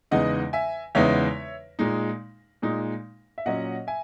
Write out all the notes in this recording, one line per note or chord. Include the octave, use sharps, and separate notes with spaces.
E2 C#3 G#3 B3 D#4 D#5 F#5
E5 G#5
E2 C#3 G#3 B3 D#4 C#5 E5
A#2 G#3 D#4
A#2 G#3 D#4
E5
A#2 F#3 C#4 D#5 F#5
E5 G#5